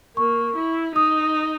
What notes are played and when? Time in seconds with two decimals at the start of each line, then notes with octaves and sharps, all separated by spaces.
0.17 A#3 C#6
0.56 E4
0.95 D#4 D#6